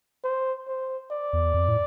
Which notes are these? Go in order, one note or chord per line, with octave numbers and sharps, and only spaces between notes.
C5
C5
D5
E2
F2
A2